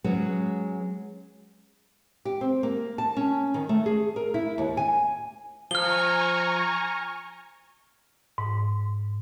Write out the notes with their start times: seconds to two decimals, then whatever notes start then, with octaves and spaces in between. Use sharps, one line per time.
0.04 F#3 G#3 B3 C#4
2.25 G4
2.41 C4
2.63 A#3
2.98 A5
3.17 C#4
3.54 D#3
3.69 A3
3.86 G#4
4.16 A#4
4.34 E4
4.58 D#2
4.77 G#5
5.71 F3 G#5 A#5 C#6 F6 G7
8.38 G#2